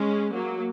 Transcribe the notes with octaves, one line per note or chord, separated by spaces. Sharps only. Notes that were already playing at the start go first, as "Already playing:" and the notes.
Already playing: G#3 C#4
F#3 A#3